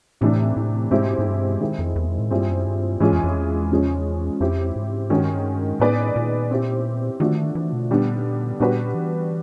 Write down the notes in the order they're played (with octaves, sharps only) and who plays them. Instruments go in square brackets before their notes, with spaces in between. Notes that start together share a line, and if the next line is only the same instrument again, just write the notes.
[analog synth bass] A2 [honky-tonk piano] C3 E3 A3 D4
[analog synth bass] A2
[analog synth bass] G#2 [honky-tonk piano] B2 G#3 C4 E4 G4
[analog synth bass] G#2
G2
[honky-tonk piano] D#3 G#3 C4 E4
[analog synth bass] F2
E2
F2
A2
[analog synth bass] G2 [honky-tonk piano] A#2 G3 C4 E4 G#4
[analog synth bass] F#2
G2
[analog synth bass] G#2 [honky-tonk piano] E3 G#3 C#4 F4 G#4
[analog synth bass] F2
F2
E2
[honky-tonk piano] C#3 F3 G#3 C#4
[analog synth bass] F2 [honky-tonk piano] C4 E4 G4 C5
[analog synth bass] G#2
[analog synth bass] G2 [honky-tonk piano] D#3 G#3 C#4 F#4 A#4
[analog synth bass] A2 [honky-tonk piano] B3 D#4 G#4 B4 D5
[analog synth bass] A#2
[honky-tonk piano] C4 E4 G4
[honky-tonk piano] D3 F3 A3 D4 F#4 [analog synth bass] D#3
[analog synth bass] E3
B2
[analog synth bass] A#2 [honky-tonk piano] D3 G3 B3 D4
[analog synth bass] A#2 [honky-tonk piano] G3 B3 D4 F#4 B4
[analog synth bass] E3